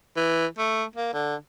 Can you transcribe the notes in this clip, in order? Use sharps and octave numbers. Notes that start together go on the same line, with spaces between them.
E3
A3
A#3
D3